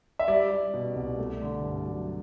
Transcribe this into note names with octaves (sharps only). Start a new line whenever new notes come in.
E5
G3 D5
G3
B2
C2
A3
D3
G2
F#3